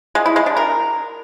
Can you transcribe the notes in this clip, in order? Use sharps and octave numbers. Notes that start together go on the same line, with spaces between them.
G#3
E4
G#3
D4
A#4